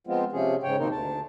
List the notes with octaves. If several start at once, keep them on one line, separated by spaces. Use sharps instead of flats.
F3 G#3 B3 C4 F4
C3 F3 C#4 G#4
G#2 C#3 C#5 G5
B2 D#3 A#3 C4 D#4 A#4
D2 A5